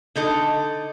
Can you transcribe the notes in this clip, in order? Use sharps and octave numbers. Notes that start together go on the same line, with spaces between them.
D3 D#4 A4